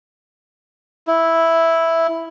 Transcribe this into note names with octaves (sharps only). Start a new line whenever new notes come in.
E4